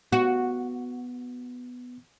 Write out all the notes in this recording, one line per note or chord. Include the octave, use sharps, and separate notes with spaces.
B3 F#4